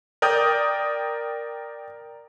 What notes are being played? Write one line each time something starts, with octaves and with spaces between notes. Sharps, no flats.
A#4 D5 G5 D#6 G6